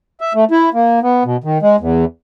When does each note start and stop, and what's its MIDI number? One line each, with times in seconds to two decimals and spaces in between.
0.21 0.33 76
0.35 0.45 57
0.51 0.70 64
0.74 1.00 58
1.03 1.24 59
1.25 1.37 47
1.44 1.58 51
1.62 1.76 56
1.80 2.05 40